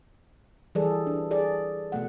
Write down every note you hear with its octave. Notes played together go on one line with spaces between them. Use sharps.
E3 G3 G#4 A4 D5
D4
G#4 A4 D5
B2 A3 F#5